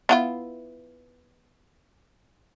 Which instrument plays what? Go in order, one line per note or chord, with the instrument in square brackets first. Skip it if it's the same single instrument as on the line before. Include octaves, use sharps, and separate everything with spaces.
[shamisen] B3 E4 F4